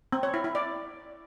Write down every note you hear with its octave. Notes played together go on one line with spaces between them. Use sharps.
C4
C#5
E4
E4
D5